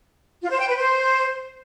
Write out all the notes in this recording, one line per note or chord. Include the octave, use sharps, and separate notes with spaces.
F4
C5
G5
B4
C5